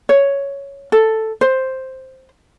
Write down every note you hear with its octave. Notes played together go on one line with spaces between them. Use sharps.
C#5
A4
C5